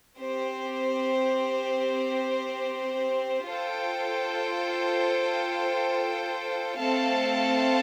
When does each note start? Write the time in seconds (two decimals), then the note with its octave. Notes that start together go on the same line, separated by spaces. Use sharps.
0.18 C4 G4 C5
3.48 F4 A4 C5 G5
6.79 A3 C4 A4 F5 A5